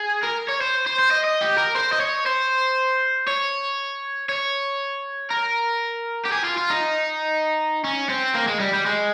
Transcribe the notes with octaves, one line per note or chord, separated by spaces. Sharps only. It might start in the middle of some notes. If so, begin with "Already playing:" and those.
Already playing: G#4
A#4
C#5
C5
C5
C5
D#5
D#5
G4
A#4
C5
D#5
C#5
C5
C#5
C#5
A#4
G4
G#4
F4
F4
D#4
C#4
C4
A#3
G#3
G3
G3
G#3